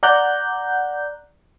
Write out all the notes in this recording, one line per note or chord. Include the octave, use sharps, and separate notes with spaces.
D5 F#5 A#5 F#6 G6